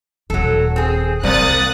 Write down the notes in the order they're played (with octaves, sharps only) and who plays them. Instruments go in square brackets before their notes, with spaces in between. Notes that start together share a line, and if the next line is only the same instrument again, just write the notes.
[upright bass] D#1 D#2 [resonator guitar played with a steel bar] F#3 A4
[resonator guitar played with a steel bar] C4 G#4
[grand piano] C2 C4 [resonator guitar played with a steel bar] C3 A#3 [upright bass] G3 [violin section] D#6 F#6 A6